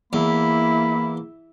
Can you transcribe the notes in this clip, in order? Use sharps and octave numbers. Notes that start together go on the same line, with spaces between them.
E2 A#3 E4 B5